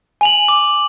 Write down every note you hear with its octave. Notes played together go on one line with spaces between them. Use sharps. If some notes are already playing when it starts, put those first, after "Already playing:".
G#5 F7 F#7
D6